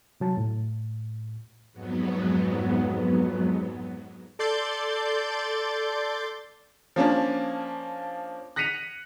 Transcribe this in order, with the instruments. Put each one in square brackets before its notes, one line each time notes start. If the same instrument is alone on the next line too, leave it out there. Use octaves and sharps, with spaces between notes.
[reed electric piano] C3 F#3 A5
A2
[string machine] F2 G#2 F#3 B3
[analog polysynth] A4 D5 C6 G6 A6
[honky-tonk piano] F3 A#3 C#4 D4
F#6 A#6 B6 C#7 D#7 F7